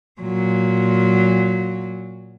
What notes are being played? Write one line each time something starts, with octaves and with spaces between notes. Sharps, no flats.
A#2 F#3